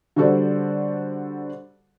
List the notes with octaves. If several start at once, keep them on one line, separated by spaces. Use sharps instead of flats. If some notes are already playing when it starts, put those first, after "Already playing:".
D3 G3 F#4 A4 C5 D5